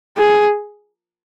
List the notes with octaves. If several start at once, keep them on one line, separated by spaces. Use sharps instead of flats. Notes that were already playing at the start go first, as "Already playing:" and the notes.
G#4